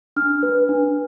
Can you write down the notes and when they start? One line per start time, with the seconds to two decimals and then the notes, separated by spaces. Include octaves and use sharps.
0.16 D4 F6
0.43 B4
0.69 D4